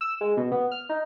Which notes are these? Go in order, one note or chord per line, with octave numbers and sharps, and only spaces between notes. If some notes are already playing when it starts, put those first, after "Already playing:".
E6
G#3
B2
B3
F6
D#4